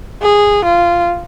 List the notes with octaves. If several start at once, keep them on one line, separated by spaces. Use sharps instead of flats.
G#4
F4